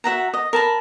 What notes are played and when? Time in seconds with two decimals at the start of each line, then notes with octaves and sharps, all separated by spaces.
0.04 F#4 E5 F#5 A#5
0.34 D#5
0.53 A#4 A5 B5